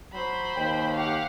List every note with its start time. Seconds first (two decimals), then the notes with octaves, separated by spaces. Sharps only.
0.13 F#3 C5 B5
0.56 D#2 G5
0.96 G4 F5 F#5